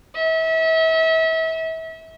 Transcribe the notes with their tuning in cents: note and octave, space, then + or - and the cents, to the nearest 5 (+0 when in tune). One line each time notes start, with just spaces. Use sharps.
E5 -35